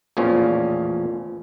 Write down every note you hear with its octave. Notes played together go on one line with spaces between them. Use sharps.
A1 E2 A#2 F3 C#4 F4